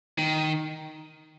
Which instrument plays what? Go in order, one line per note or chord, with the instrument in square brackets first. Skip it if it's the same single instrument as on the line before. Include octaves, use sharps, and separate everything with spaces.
[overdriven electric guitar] D#3